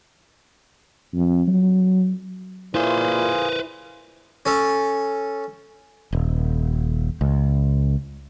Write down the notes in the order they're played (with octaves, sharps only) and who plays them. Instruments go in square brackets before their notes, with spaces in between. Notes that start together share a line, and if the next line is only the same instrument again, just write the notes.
[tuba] F2
F#3
[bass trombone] A#2 [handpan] E4 [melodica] F4 G#4 [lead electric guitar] B4 C5
[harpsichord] C#4 A4
[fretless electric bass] D#1
C#2